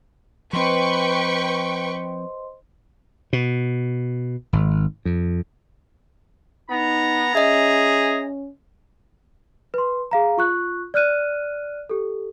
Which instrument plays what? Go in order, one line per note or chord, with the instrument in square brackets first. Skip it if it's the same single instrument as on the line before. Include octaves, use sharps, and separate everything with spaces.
[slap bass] F3 C4 [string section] B4 G5 C#6 [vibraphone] C5 D#5 C6
[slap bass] B2
G#1
F2
[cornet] B3 [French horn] D#4 [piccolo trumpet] A#5
[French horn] C#4 [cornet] G#4 [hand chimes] D#5 E5
[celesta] B4 C6
G#4 F5 A#5
F4 C#6 F#6
D5 F6 F#6 D#7
G4 A4